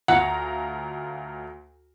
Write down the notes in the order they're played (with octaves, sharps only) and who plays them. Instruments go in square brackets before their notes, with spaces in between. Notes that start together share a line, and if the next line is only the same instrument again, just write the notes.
[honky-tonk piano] D2 F4 A#5 [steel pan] F#5